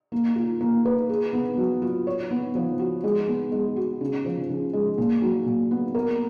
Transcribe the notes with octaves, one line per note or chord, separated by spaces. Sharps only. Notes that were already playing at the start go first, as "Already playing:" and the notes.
A#3
F4
A#3
B4
G#4
B3
F#3
F4
C#5
B3
F3
F#4
G#3
B3
G#3
F#4
C#3
F3
C#3
G#3
A#2
F#3
A#2
B3
A#4